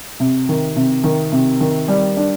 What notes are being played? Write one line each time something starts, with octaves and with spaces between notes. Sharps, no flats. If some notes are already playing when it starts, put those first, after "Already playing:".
C3
D#3
C3
D#3
C3
D#3
G3
D4